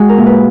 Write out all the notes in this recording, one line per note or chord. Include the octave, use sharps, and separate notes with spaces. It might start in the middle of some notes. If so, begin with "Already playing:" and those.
Already playing: G#3 F#4 G#4
A#4
A#2
B4